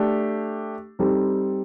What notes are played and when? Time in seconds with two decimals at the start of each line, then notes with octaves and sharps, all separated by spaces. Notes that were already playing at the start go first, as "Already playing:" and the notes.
Already playing: A3 D4 G4
0.99 G3 C4 D#4 A4